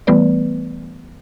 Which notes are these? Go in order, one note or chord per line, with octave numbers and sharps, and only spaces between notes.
E3 G3 A3 B3 B4 D5